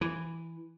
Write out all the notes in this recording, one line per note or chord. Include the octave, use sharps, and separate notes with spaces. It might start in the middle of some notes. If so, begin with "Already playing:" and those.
E3